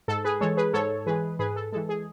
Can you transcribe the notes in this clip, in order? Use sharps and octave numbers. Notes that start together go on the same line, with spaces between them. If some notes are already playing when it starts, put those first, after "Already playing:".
G#2 A4
G#4 B4
E3 G#3 A4 C#5
G#4 B4
G#2 A4 C#5
E3 G#3 G#4 B4
G#2 G#4 B4
A4
E3 G#3 A4
G#4